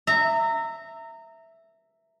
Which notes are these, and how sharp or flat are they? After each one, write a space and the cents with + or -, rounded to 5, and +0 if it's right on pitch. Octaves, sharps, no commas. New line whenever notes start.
E5 +0 A#5 -25